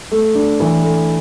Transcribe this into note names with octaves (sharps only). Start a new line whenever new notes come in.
A3
D4
E3
A3